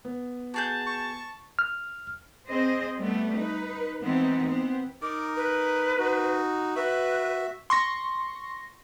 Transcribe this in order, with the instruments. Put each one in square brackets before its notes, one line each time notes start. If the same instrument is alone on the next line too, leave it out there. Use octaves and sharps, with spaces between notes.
[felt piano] B3
[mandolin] F#4 G#4 G6 [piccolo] A5
[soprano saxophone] C#6
[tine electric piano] F6
[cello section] C4 G#4 C5 D#5
G3 A3 B3
D#4 B4
E3 G#3 B3 C4 D#4
B3 C4
[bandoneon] D#4 A#4 [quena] D6
[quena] B4
[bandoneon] D#4 F#4
[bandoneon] F#4 E5 [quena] B4
[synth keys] C6 C#6 A#6